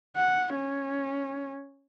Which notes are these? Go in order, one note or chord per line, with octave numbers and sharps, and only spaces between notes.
F#5
C#4